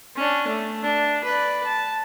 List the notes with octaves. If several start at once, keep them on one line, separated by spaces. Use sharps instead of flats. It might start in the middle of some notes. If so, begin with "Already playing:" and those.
C#4 D4
A3
D4
B4 D5
A5